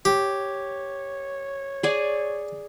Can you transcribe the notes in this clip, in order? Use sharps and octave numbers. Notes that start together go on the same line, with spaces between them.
G4 C#5
G#4 D5 G#5